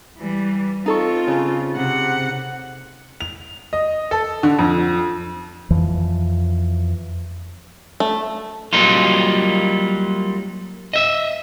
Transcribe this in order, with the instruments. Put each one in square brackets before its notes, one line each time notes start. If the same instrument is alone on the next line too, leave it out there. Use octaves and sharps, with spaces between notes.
[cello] E3 G3
[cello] C4 F4 [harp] D#4 A4 C#6
[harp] C#3
[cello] C3 F#5
[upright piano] F7
D#5
A4
D3
F2
[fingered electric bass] F2 E3 F3
[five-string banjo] A3
[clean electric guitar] F#3 G3 A#3 D#4 F4
D#5 E5